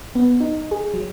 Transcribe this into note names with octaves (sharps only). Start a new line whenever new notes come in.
B3
D#4
G#4
F#3